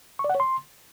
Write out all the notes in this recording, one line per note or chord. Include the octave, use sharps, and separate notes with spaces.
C#6
D5
F#5
C#5
C6